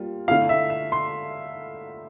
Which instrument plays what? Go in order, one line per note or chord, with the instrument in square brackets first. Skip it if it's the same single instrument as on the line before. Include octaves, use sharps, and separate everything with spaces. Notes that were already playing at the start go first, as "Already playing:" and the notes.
Already playing: [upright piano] G3 A#3 F4
[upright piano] D3 A3 E4 [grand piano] F5
[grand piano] E5
E5
C6